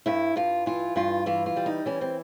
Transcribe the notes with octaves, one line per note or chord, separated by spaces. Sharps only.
G2 E4
G2 F4
E3 F4
G2 F4
E3 F4
F4
G3
D#4
E3 C#4
C4